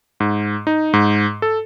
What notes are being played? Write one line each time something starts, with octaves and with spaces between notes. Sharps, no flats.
G#2
D#4
G#2
A4